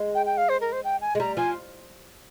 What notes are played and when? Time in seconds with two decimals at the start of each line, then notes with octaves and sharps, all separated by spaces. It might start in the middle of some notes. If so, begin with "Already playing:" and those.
Already playing: G#3
0.15 G5
0.26 G5
0.37 F5
0.49 C5
0.61 A#4
0.72 C5
0.84 G5
1.01 G#5
1.15 G#3
1.20 G3 A#5
1.37 F3 G#5